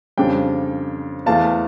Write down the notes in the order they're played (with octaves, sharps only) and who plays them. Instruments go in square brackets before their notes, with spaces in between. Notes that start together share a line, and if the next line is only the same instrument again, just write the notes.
[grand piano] F2 C#3 G3 D4 G5
E2 E3 A3 F5 A5